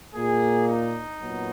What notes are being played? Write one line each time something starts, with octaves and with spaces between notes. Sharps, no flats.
A#2 A#3 G#4
D#4
A#2 F#3 B3